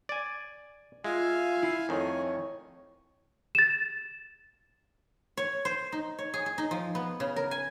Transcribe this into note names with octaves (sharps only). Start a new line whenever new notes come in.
D5 G#5
G#3 F4 E5 F5 G#5
E4 C7
F2 D#3 A3 C#5 G#5
A6 E7
C#5
C5
D#4
C#5
G#4
G#4
D#4
F3
B3
C#3
A#4
G#5